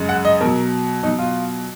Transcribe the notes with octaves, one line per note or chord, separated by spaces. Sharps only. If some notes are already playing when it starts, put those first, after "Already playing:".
Already playing: F#2 C#3 G#3
F#5
D#5
B2 F#3 A#4
B2 F#3 D#4
F4